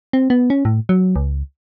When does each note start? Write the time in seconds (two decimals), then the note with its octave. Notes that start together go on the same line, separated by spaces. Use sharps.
0.13 C4
0.30 B3
0.50 C#4
0.65 A2
0.89 F#3
1.16 C#2